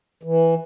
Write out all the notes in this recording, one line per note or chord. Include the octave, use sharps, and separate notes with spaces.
E3